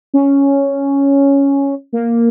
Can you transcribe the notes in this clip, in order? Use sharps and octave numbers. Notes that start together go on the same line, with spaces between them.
C#4
A#3